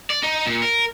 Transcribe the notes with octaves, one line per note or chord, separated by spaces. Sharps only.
D5
D#4
A#2
A#4